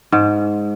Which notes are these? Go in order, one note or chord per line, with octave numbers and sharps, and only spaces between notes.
G#2